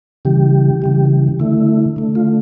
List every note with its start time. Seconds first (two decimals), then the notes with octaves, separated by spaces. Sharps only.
0.25 C#3 E3 G3 G4
0.82 C#3 E3 G3
1.40 D3 A3 E4
1.96 D3 A3
2.15 F4